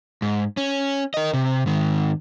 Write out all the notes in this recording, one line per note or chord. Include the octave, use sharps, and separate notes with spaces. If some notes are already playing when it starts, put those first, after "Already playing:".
G#2
C#4
A#4 D#5
C3
G#2 D#3